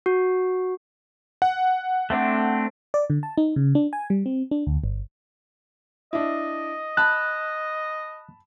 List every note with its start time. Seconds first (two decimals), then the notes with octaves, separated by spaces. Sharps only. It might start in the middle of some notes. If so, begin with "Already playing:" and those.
0.06 F#4
1.42 F#5
2.10 A3 C4 D4
2.94 D5
3.10 D3
3.23 A5
3.38 D#4
3.56 C#3
3.75 D4
3.93 G#5
4.10 G3
4.26 C4
4.51 D4
4.67 D2
4.84 G1
6.13 D4 E4 D#5
6.97 A5 B5 F#6